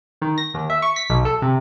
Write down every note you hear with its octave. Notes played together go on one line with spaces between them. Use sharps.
D#3
A#6
D#2
E5
C#6
B6
B1
A4
C3